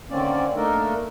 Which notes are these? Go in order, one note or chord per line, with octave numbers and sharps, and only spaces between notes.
D3 D#3 A#3 C4 C#4 D5
A3 A#3 D4 D#4 A4 A#4